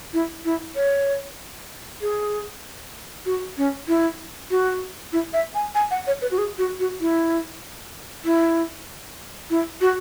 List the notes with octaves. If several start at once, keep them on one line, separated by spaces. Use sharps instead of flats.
E4
E4
C#5
G#4
F#4
C#4
E4
F#4
E4
E5
G#5
G#5
F#5
C#5
B4
F#4
G#4
F#4
F#4
E4
E4
E4
F#4